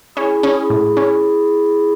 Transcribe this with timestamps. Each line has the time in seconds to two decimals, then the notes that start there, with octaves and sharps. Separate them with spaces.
0.16 C#4 E4 G#4
0.43 C#4
0.56 E4 G#4
0.70 A2
0.97 C#4